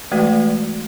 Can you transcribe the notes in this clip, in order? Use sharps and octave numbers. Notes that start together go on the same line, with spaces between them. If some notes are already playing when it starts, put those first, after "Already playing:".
E3 G#3 A3 F#4 B4 D5